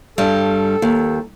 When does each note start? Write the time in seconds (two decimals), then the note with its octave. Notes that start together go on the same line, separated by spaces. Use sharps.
0.18 G2 G3 A4
0.82 D#2